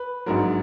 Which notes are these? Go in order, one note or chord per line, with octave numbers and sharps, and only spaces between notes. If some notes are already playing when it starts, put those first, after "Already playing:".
Already playing: B4
A#1 G#2 F#3 A#4